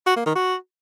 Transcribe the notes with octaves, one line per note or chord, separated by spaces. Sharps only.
F#4
A#3
D#3
F#4